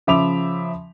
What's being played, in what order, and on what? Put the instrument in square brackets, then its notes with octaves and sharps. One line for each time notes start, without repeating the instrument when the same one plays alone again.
[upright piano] C#3 F3 E5 B5 D6 F7